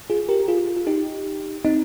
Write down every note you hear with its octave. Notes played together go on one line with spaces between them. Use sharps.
F4 G#4
G4 A#4
F4 G#4
F4
D#4 G4
C4 D#4